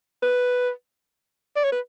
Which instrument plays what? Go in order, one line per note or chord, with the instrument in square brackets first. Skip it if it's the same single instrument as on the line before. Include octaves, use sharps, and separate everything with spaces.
[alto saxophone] B4
D5
C#5
B4